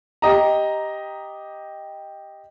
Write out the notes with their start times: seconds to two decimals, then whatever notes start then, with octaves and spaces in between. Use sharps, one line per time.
0.22 G4 D#5 A#5